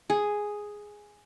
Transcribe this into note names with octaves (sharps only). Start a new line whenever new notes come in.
G#4